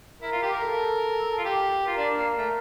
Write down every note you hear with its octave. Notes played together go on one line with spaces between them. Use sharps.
E4 A#4
F4
G4
A#4
A4
F4
G4
F4 A#4
D4
A#3
A3